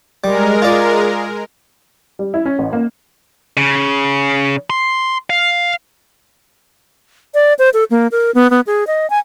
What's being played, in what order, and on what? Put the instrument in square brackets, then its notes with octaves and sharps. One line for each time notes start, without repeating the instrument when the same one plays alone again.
[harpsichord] G3 [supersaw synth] G#3 A#4
[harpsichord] F4 D5
[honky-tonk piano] G3
E4
C#4
A1
A#3
[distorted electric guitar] C#3
C6
F5
[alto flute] D5
C5
A4
A#3
A#4
B3
B3
G#4
D#5
G#5